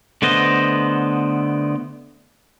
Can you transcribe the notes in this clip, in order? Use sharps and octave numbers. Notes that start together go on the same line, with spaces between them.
D3 A3 B3 C5 D#5